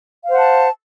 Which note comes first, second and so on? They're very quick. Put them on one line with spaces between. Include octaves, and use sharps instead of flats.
F5 C5 F#5 A5